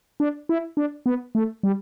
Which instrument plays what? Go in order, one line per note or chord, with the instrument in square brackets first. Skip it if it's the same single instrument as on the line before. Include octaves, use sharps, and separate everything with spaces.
[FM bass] D4
E4
D4
B3
A3
G3